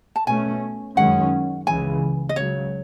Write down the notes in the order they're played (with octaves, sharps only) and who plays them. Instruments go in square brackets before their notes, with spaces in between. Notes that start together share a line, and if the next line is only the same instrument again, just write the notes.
[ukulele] A5
[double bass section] B2 A3 C#4 [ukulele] G#5
[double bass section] F#2 D#3 G#3 C#4 [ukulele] F#5
[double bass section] C#2 C#3 E3 [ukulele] G#5
[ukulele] D#5
[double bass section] C#2 C#3 F#3 [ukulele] C#5